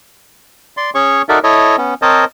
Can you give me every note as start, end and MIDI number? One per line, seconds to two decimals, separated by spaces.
0.77 0.90 74
0.77 0.90 84
0.95 1.22 61
0.95 1.22 68
0.95 1.22 73
0.95 1.22 85
1.29 1.39 63
1.29 1.39 66
1.29 1.39 69
1.29 1.39 70
1.29 1.39 74
1.29 1.39 76
1.43 1.76 64
1.43 1.76 69
1.43 1.76 73
1.43 1.76 75
1.78 1.94 59
1.78 1.94 61
2.02 2.25 60
2.02 2.25 70
2.02 2.25 72
2.02 2.25 73
2.02 2.25 75
2.02 2.25 81